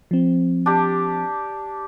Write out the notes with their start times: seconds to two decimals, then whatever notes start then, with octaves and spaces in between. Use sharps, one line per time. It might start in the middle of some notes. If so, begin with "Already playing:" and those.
0.11 F3 C4
0.66 D4 G4